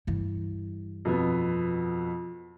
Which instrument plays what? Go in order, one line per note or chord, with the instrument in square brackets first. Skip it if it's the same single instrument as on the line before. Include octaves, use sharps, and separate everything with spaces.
[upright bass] G2 E3
[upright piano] F2 B2 B3